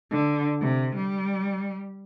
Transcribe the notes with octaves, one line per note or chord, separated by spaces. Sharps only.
D3
C3
G3